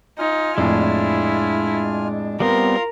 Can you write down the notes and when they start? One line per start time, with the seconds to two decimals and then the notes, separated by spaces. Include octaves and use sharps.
0.19 D#4 F4 G#5 F6
0.58 F2 A2 G#3 D4 E4
2.40 G3 B3 C4 F4 A#4 F5